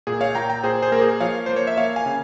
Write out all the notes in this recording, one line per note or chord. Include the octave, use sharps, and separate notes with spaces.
A#2 G#4
C#5 F5
A#2 G5 A#5
G5 A#5
A#2 G#4 C5
G#4 C5
A#3 A#4
G#4
F3 C#5 F5
A#3 C5
C#5
E5
A#3 C#5 F5
F5 G#5
C#3